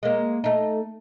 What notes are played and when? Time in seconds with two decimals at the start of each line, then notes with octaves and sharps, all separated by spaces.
0.03 G#3 A#3
0.44 A3 D#4